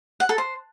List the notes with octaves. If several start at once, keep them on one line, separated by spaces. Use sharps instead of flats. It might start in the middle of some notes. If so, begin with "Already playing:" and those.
F#5
A4
C5